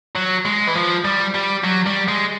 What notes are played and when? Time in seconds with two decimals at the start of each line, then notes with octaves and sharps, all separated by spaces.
0.16 F#3
0.45 G#3
0.67 E3
0.75 F3
1.05 G3
1.35 G3
1.64 F#3
1.87 G3
2.08 G#3